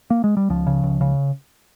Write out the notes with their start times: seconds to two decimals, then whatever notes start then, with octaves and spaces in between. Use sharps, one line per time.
0.10 A#3
0.24 G#3
0.37 G3
0.50 C#2 F3
0.67 C#3
0.83 C#2
1.01 C#3